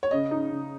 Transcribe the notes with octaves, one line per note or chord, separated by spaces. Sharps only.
C#5
C#3 D#5
D#4
C#3